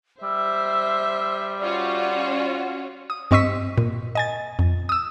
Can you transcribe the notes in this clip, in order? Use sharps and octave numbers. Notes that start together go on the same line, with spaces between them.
G3 C5 E5 E6
C#4 F4 F#4 D5
D#6
G2 C4 D#5 C#6 E6 B6
A#2
D#5 G#5 A6
F2
D#6 E6